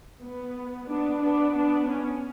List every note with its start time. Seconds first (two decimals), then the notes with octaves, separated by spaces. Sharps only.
0.22 B3
0.88 B3 D4
1.21 B3 D4
1.54 B3 D4
1.88 C#4